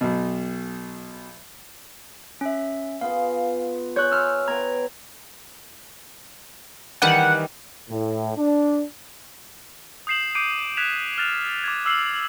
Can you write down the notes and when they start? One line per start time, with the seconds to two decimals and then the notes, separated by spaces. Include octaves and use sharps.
0.01 B1 B2
2.41 C#4 E5
3.01 B3 F4 G#4 F5
3.96 G#4 C#5 C6 F#6 G6
4.12 E5 G#5 C6 E6 F6
4.48 B3 G5 A#5 G#6
7.02 D#3 E3 G3 F#5
7.89 A2
8.37 D4
10.07 D#6 G6 C7 E7 F#7
10.35 D6 G6 C7 D7 D#7
10.77 F#6 G#6 B6 E7 F7
11.18 F6 F#6 A6 F7
11.64 D6 G#6
11.85 D6 E6 F6 C7 F#7